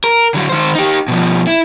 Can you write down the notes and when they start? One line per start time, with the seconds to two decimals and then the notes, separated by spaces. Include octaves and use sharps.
0.04 A#4
0.34 D3 F#3
0.50 D#3 C5
0.75 D#4 G4
1.08 B2 F3
1.47 E4